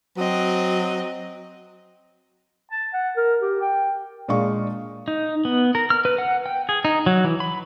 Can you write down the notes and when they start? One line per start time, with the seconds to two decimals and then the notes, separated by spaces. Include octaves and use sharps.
0.17 F#3 C4 D#5
2.71 A5
2.94 F#5
3.17 A#4
3.42 G4
3.61 G5
4.28 A#2 G#3 D4 F5 C#6
5.08 D#4
5.45 B3
5.75 A#4
5.90 F6
6.05 B4
6.18 F#5
6.46 G5
6.69 G#4
6.85 D#4
7.06 F#3
7.24 E3
7.40 B5